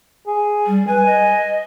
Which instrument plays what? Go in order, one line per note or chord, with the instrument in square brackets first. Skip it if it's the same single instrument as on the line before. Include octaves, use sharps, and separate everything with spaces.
[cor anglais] G#4
[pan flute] G3
[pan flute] B4 [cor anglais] G#5
[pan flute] D#5